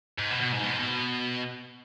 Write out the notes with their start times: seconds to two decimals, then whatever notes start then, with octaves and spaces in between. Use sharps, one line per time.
0.18 G#2
0.30 B2
0.41 B2
0.52 G#2
0.63 B2
0.71 G#2
0.79 B2